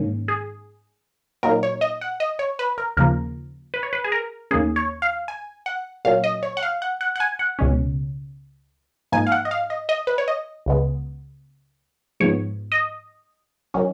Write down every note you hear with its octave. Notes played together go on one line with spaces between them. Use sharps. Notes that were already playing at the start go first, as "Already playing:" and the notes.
Already playing: G#2 D#3 A#3 C#4
G#4
A#2 F#3 A#3 D#4 A#4
C#5
D#5
F#5
D#5
C#5
B4
A#4
D#2 C#3 F3 A#3 A#4
B4
C#5
B4
G#4
A#4
D#2 D#3 A#3 C#4 G#4
C#5
F5
G#5
F#5
A#2 F#3 A#3 C#4 F5
D#5
C#5
F#5
F5
F#5
F#5
F#5
G#5
F#5
C#2 B2 G#3 C#4
G#2 F3 A#3 D#4 G#5
F5
F#5
D#5
F5
D#5
D#5
B4
C#5
D#5
C#2 C#3 G#3 B3
G#2 F3 G#3 B3 C#5
D#5
D#3 F#3 C#4